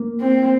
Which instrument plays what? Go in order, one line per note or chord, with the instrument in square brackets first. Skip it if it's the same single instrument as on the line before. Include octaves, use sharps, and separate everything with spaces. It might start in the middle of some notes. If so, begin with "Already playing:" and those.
Already playing: [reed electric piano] A#3
[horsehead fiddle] C4